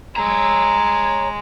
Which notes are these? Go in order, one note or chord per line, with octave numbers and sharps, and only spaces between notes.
G#3 C#5 A#5